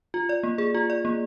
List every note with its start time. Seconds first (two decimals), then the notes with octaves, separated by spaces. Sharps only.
0.14 F4
0.29 D5
0.43 A#3
0.58 G#4
0.74 F4
0.90 D5
1.05 A#3